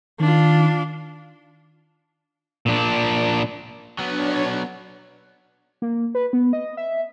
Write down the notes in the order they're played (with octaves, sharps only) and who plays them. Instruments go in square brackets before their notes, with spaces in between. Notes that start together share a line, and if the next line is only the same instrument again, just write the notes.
[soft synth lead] D#3 [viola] D4 F4
[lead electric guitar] A#2 D4
[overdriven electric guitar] F#3 B3 [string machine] D4 C#5
[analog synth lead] A#3
B4
B3
D#5
E5